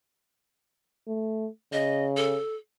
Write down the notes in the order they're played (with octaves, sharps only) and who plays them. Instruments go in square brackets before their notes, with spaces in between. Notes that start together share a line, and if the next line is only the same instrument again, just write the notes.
[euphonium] A3
[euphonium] C#3 [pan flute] D#5
[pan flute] A4